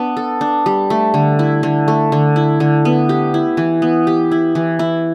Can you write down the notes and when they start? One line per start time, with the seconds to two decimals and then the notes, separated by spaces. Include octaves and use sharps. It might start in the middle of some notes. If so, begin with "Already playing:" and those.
Already playing: B3 D4
0.17 A4
0.41 D4
0.66 G3
0.90 A3
1.14 D3
1.39 E4
1.63 D3
1.88 A3
2.12 D3
2.36 E4
2.60 D3
2.85 B3
3.09 G4
3.34 E4
3.57 E3
3.82 B3
4.07 G4
4.31 E4
4.55 E3
4.79 E4